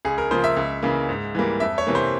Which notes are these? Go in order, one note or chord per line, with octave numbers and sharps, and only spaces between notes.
C#2 G#4
A#4
C#3 F3 A#3 C5
E5
C#2
C#3 E3 A#3
G#2
E3 G3 A#3
F2 E5
C#5
C3 E3 A#3
C5